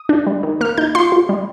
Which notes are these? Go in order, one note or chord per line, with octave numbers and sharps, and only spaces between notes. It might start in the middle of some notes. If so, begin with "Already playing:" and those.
Already playing: D#6
D4
G3
D#3
A#3 F6
D#4 G6
F4 C6
F4
G3